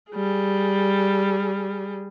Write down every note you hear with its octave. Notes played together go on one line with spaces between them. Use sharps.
G3 G#4